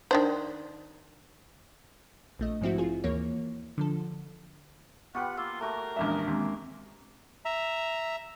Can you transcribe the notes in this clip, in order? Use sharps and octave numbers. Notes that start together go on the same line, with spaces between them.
D#3 D4 C5
A#1 A3 D#5
G#2 F3 C4 E4 F#4
F4 G#4
D#2 E3 A#3 C#5
D3 F3 A4
B3 F4 G4 B4 F#5 G5 C#6
A#3 F4 E6
A3 F#4 G4 A#4
A#1 E2 G#3 C#4 D4 E5
D#2 G#3 A#3 C4
E5 A#5